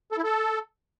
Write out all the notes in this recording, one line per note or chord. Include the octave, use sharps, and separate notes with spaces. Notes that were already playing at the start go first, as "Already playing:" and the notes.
A4
E4
A4